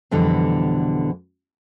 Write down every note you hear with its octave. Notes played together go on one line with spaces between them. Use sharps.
F2 B2 D3 E3 G3